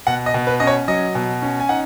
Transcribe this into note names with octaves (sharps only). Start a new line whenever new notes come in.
B2 F#5
D#5
B2
B4
C#4 D#5
C#5
F#3 D#5
B2
C#4
G#5
D#4 F#5